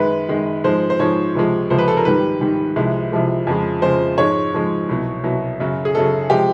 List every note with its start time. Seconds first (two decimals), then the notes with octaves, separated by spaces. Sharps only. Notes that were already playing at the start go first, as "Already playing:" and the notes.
Already playing: F#2 D#3 G#3 B4
0.29 F#2 D#3 G#3
0.64 G#2 F3 G#3 C5
0.90 C5
0.99 G#2 F3 G#3 C#5
1.35 C#2 C3 F3 G#3
1.70 C#2 C3 F3 G#3 C5
1.78 B4
1.88 A4
1.97 A#4
2.05 G#2 D#3 G3 B4
2.41 G#2 D#3 G3
2.76 C2 C3 F3 G#3
3.12 C2 C3 F3 G#3
3.47 F2 C#3 F3 G#3
3.82 F2 C#3 F3 G#3 C5
4.18 G#2 F3 G#3 C#5
4.53 G#2 F3 G#3
4.89 C2 B2 F#3
5.24 C2 B2 F#3
5.60 F#2 C#3 F#3
5.85 G#4
5.95 F#2 C#3 F#3 A4
6.30 C3 F3 G#3 G4